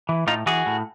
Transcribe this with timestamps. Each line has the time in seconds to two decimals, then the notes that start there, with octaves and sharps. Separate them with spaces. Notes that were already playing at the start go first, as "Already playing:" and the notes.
0.09 E3
0.27 A2 D#4 F4
0.46 E3 F#4 G#4
0.66 A2